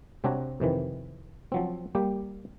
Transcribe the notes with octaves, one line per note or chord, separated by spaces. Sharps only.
C3 C4 D4 F#4 C#5 A#5
F2 C3 D#3 E3
F3 F#3 C4
G3 A#3 G4